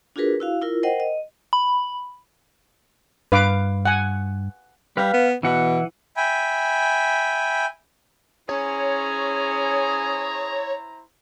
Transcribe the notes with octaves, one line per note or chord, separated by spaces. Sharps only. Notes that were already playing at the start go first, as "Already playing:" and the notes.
D4 F4 F#4 G#4 A#4 B4
E4 F#4 F5
E4 F4 A#4
A#4 C5 D#5 F#5 G5
D#5
B5
G2 B4 F5 D6
F#5 G#5
G3 B4 F5
B3
B2 E3 F#5
E5 G5 G#5 B5
C#4 E4 G#4 C5 C#5 A#5